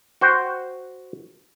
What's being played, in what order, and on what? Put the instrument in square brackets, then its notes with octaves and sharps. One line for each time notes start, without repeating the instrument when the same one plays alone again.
[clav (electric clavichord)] F#4 C5 G5